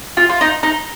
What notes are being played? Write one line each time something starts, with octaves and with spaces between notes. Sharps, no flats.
F4
F4
D#4
D#4